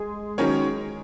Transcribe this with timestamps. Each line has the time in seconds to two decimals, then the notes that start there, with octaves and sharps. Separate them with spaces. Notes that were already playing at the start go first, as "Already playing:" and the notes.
Already playing: G#3
0.38 D#3 F#3 C#4 A#4 C#5